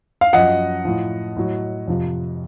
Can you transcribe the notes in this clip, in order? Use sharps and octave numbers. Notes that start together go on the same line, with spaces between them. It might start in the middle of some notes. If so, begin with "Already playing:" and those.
F5
F#2 F3 D#5 F#5
A2 F3
A2 F#3
F2 C3 F3